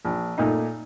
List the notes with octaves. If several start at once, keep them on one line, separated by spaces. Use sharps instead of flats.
A#1
A#2 A3 D#4